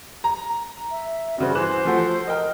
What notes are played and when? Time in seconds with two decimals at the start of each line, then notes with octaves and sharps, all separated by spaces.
0.24 A#5
0.90 E5
1.38 G2 C#3 F#4 C5
1.55 E3 C5 F#6 E7
1.85 F3 A3 F#4
2.27 A#4 D#5 G5